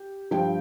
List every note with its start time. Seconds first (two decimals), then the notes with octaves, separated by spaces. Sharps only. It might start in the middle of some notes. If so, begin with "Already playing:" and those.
Already playing: G4
0.31 G2 F3 G4 G5